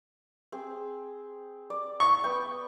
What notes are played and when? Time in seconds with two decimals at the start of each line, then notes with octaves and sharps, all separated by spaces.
0.52 C4 G#4
1.70 D5
2.00 C#6
2.24 B3 G5